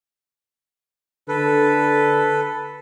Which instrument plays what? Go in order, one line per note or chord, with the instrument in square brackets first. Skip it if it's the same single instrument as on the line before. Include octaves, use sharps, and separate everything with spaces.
[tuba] D3 [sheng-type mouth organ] A4 B4